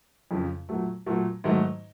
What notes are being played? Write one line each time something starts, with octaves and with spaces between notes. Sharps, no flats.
F2 C#3 F3
A#2 F#3 A3
A#2 F#3 A3
G#2 D#3 F#3 A3